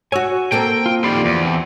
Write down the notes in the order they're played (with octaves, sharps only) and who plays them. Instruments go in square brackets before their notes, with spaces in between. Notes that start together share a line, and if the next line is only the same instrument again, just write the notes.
[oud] F#4 C#5 [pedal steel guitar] G#5 E6
[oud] A#3 C4 A4 [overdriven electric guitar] G5
[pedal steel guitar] F4
[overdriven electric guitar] D#3 G3 [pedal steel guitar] F3 D5 C6
[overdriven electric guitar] E2
[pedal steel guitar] C4 G4 A4